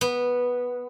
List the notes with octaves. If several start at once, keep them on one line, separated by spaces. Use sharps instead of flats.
B3